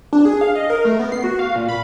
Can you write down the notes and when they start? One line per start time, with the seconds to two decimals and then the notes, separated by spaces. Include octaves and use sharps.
0.13 D4
0.25 G#4
0.41 F5
0.55 D#5
0.70 A#4
0.85 A3
0.99 B3
1.12 C7
1.24 F#4
1.39 F5
1.56 A#2
1.69 B5